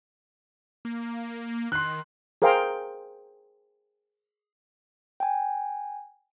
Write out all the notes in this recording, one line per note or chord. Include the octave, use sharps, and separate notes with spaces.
A#3
D#3 C6 F#6
G#4 A#4 C5 F5 G5 A#5
G5 G#5